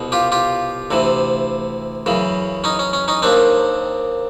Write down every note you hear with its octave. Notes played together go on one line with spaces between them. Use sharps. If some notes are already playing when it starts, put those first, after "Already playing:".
Already playing: C2 B2
F4 G4
F4 G4
D2 C3 E3
F#2 C#3 E3
C#4 D#4
C#4
C#4
C#4 D#4
D#2 D#3 C4 D4